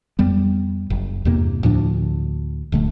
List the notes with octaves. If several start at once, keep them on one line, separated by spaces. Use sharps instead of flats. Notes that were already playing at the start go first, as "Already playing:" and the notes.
F2 G3 B3
F#1
E2 G2 C3 A#3
D2 A2 F3 D4
D1 D3 A3